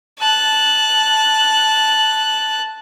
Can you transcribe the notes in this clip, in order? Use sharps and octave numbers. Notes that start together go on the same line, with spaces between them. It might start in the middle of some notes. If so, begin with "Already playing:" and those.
A5 F#6